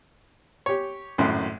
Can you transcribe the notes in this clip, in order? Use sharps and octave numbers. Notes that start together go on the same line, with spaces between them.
G4 C#5
G#1 F#2 A2 C6